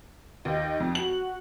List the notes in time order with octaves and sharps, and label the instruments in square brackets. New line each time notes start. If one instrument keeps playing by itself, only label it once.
[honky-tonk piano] D#2 [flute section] D#4 D#5 G6
[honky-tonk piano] F2
[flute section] F#4 [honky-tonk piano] F#7